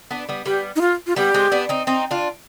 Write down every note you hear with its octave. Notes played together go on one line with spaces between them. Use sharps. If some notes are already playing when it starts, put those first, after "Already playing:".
B3 D4
G3 B3
G3 B3 G4
D#4
F4
F4
G3 B3 G4
G#3 C4
B3 D4
C4 D#4
C4 D#4
D4 F4